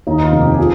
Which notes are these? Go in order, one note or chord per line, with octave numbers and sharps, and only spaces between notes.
D#2 D#4
F4
F1
G4
F3 G#4